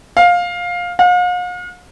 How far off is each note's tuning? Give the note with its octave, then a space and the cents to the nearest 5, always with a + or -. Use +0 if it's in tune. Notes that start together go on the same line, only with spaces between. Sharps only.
F5 +15
F5 +45